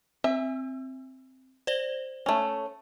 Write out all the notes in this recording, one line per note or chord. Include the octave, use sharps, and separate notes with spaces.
C4 E5
C5 D5 G7
A3 C#4